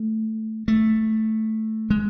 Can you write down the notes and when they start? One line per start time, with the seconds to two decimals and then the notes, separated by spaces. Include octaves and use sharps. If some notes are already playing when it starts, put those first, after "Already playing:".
Already playing: A3
0.68 A3
1.90 G#3